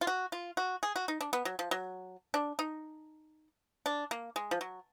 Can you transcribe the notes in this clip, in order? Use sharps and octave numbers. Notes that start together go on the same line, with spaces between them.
F4
F#4
F4
F#4
G#4
F#4
D#4
D4
B3
F#3
F3
F#3
D4
D#4
D4
A#3
G#3
F3
F#3